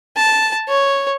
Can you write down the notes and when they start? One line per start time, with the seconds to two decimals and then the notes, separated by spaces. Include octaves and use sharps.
0.17 A5
0.68 C#5